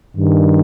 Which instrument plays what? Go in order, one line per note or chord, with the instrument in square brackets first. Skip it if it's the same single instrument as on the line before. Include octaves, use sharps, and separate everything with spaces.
[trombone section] G2 D#3